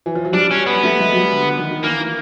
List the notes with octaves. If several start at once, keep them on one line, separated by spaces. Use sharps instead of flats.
E3
F3
F#3
G3 D4
C#4
B3
A3
G#3
F#3
G3
D3
D#3
D#3
E3 A#3